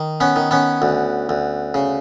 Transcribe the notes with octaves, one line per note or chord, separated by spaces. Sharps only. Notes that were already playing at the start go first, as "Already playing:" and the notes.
Already playing: D#3
B3 C#4
D#3
B3 C#4
D2
D2
C#3